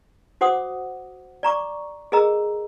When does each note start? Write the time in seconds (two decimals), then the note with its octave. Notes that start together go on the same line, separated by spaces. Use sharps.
0.41 F#4 C5 F#5 D6 D#6
1.43 D5 A#5 C#6 D6
2.12 G#4 A#4 D#5 A#5 E6